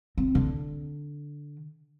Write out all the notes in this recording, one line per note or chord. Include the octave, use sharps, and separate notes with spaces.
C4
D3